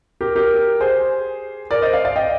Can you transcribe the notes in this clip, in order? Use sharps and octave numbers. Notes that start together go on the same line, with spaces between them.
G4 A#4
G4 A#4
G#4 C5
A#4 D5
C5 D#5
D5 F5
D5 F5
D#5 G5